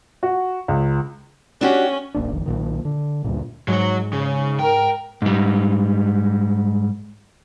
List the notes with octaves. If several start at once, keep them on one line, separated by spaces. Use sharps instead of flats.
F#4
C#2
C#4 D4 F#4 G4
D1 A1 A#3 D4
F1 A#1 D#3
B1 A#2 D#3
D3
D2 G2 A#2
G#2 F#3 C#5
C#3
A#4 G5
G#2 G3